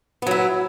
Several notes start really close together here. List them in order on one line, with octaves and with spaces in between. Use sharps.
B3 F#3 E4